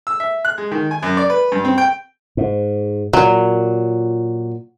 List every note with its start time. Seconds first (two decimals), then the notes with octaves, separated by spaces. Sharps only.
0.07 E6
0.20 E5
0.45 F#6
0.58 G#3
0.72 D#3
0.91 G#5
1.03 F#2
1.17 D5
1.30 B4
1.52 G2
1.65 C4
1.78 G5
2.37 G#2
3.13 A#2 F#3